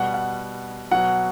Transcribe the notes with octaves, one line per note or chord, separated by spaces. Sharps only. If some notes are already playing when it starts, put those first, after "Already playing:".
Already playing: B2 G3 F#5
F#5
B2 F#3 F#5